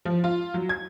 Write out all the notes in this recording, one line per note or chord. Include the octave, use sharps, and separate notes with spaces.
F3
F4
F#3
G#6